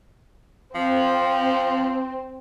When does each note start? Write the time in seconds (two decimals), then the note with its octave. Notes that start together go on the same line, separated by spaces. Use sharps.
0.75 F3 C4